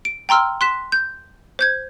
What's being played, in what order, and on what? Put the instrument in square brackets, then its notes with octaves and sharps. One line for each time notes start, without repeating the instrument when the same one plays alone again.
[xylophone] D7
G5 A#5 C6 E6 F6
C6 F#6 B6 E7
G6
C5 G6 G#6